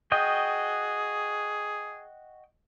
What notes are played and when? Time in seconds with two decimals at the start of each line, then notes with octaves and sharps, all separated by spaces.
0.12 F#4 G#4 D#5 G5